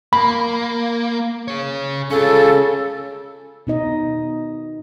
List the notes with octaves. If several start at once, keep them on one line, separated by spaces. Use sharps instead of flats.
A#3 B5
G#4 C#5
C#3 C#4 F4 A4
B2 D#4 D#5